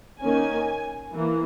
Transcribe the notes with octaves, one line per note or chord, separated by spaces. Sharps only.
D#3 A#3 C#4 G#5
E3 A#3